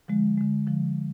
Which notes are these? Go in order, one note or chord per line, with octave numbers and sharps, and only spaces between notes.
D3 F3 G#3
D3 F3 G#3
D3 F3